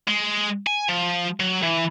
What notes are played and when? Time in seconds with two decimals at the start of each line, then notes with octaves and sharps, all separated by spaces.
0.08 G#3
0.67 G#5
0.89 F3
1.40 F#3
1.63 E3